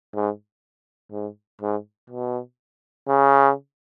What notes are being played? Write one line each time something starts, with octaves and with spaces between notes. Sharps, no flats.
G#2
G#2
G#2
B2
C#3